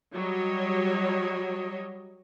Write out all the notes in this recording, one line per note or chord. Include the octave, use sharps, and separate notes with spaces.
F#3 G3 C#5 D#5